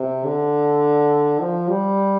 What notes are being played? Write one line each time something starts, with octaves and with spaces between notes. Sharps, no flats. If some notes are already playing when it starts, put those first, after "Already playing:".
Already playing: C3
D3
F3
G3